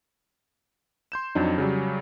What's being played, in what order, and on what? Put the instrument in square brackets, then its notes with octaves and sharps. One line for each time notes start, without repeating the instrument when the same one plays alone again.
[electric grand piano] C6 G6 E7
F2 F#3 D4 D#4
C#3 F#3 G3